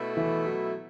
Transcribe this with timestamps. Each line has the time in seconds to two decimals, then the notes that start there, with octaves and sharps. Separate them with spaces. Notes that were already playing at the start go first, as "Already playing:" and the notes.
Already playing: B2 A3 E4
0.17 E3
0.45 F#3